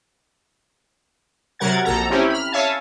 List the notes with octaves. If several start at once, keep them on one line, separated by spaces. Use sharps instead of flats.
C3 F#3 A#4 F#5 G#6 A6
A#1 A4 A#5
C4 C#4 E4 G4
B5 F6
C#5 E5 F5 G#5 A5